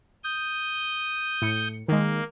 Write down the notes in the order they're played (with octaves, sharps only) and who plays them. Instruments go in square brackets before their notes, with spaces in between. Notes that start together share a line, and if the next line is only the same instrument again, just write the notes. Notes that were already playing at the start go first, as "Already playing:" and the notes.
[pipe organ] D#6 G6
[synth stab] A2 C#7
[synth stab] D#3 G#3 [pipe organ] A#3